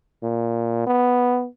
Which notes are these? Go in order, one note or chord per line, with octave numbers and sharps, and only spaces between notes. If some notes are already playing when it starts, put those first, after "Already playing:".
A#2
B3